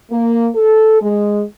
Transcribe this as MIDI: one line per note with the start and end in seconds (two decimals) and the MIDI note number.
0.12 0.49 58
0.55 1.00 69
1.01 1.42 56